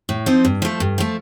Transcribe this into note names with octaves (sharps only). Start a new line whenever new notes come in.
A2
F3 C4 D#4
G2
F3 A3
G2
F3 A3